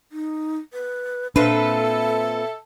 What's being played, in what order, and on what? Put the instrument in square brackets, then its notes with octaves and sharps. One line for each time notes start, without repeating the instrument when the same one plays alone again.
[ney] D#4
B4
[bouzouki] A#2 C4 B4 [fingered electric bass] D4 [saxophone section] A4 [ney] E5